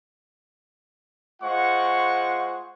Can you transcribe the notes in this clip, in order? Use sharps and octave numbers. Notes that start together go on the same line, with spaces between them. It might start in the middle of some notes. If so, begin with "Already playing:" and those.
G#3 F4 C5 F#5 C#6